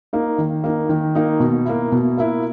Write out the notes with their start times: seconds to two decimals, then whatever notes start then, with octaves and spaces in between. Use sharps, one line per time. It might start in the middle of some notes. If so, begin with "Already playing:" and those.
0.13 A#3 D#4
0.38 D#3
0.64 A#3 D#4
0.89 D#3
1.15 A#3 D#4
1.40 B2
1.66 A#3 E4
1.92 B2
2.18 A#3 E4